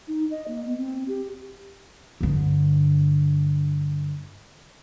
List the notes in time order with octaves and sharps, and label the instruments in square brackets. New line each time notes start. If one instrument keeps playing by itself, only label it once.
[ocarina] D#4
D#5
A#3
B3
C4
G4
[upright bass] G2 D3